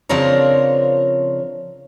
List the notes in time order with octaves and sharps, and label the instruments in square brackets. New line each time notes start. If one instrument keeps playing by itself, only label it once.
[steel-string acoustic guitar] C#3 F3 C4 D4 A#4 C#5